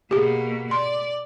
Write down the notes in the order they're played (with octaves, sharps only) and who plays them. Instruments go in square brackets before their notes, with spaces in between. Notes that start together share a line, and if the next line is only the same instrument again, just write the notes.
[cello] B2 A#3 [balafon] G4 G#4
[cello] D5 [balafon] C6